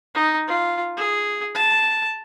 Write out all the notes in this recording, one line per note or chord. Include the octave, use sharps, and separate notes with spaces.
D#4
F4
G#4
A5